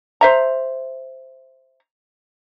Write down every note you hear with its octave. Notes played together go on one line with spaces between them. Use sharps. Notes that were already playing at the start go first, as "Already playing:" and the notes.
C5 E5 A#5